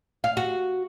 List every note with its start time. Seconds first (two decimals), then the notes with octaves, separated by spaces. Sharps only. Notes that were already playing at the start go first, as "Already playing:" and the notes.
0.24 F5
0.37 F#4